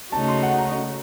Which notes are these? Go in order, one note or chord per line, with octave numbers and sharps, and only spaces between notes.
C#3 A3 D#4 F#4 A5
C6
F#5
A#5